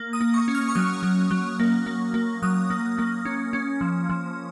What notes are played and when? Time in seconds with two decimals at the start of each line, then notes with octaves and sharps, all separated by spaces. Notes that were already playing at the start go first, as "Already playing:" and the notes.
Already playing: A#3
0.13 D#6
0.21 A#3
0.34 C#6
0.48 C#4
0.55 F6
0.69 C#6
0.75 F#3 D#6
1.03 F#3
1.31 F#3
1.59 A#3
1.86 A#3
2.14 A#3
2.42 F#3 D#6
2.70 A#3
2.98 A#3
3.25 C#4
3.53 C#4
3.81 F3
4.09 F3